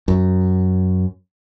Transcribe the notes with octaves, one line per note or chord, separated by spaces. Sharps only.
F#2